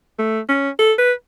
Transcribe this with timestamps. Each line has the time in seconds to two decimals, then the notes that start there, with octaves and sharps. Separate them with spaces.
0.19 A3
0.49 C#4
0.79 A4
0.98 B4